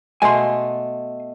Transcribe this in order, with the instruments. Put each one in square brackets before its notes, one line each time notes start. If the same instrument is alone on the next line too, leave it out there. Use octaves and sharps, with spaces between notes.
[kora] B2 A3 [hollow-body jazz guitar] G#5 C6